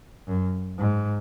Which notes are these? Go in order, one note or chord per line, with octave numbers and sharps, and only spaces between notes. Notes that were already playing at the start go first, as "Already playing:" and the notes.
F#2
G#2